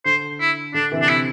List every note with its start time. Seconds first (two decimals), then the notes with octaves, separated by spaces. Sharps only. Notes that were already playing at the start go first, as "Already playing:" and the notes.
0.05 D3 C5
0.40 E4
0.74 D3 D4
0.92 C3 E3
1.02 D4
1.09 C3 E4